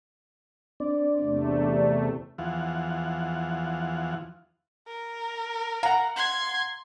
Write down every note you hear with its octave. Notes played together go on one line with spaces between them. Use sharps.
C4 D4 D5
E2 C3 A3
E2 E3 F3 F4 F#5
A#4
F5 F#5 A#5
C6 G#6